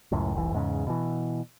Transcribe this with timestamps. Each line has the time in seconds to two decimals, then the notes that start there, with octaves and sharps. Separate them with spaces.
0.12 C#2 F#2 A2
0.34 F1 C2 E3
0.52 E2 G#2 C#3
0.87 B2 E3